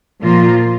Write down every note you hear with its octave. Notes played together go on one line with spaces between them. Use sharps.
A#2 F3 A#3 F4